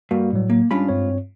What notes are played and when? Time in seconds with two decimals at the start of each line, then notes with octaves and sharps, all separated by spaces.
0.11 G2 A#3 F#4
0.33 A2 F#3
0.50 A#3
0.71 G#2 G3 C#4 D4 F4 B5
0.89 G2 C4 C#5